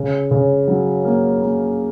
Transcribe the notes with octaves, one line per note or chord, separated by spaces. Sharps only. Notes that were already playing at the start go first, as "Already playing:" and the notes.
Already playing: C#3
C#3
F#3
A#3
A#3